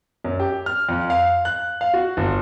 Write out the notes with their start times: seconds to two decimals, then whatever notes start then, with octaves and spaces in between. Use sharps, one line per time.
0.24 F#2
0.40 G4
0.66 F6
0.89 F2
1.10 F5
1.45 F#6
1.81 F5
1.94 F#4
2.17 G1